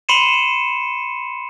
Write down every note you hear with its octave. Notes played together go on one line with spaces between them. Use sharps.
B5 C6 C7 C#7 D#7 E7